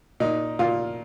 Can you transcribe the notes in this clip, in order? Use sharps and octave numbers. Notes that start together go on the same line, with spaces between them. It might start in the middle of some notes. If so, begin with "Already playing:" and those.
A#2 D#4
A#2 F4